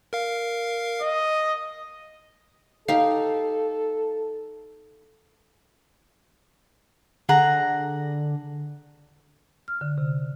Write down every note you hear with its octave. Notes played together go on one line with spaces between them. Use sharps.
A#4 F5
D#5
D#4 G4 A4 F5
D3 G#4 F#5 A#5
F6
D3
C3